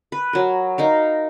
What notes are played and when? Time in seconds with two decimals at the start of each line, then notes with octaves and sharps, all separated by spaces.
0.12 B4
0.33 F#3 A#4
0.78 D#4 A#4 F5